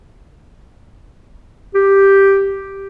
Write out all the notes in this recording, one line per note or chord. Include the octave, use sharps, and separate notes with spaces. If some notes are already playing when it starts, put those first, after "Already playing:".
G4